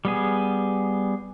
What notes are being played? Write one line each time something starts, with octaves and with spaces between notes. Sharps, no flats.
G3 B3 G#4